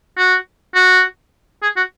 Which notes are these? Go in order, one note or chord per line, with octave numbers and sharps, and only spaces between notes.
F#4
F#4
G#4
F#4